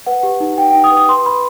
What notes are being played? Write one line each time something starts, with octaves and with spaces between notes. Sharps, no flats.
B4 F#5
G4
D#4
D#4 G5
G5
D#4
D#6
B4
D#6
B4 C6
B4 B5